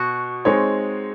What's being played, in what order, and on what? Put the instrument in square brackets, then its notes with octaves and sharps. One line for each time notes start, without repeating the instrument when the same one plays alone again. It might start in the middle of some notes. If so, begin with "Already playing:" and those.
Already playing: [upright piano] B2 [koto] F#4
[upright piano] G#3 C4 D#4 G#4 C#5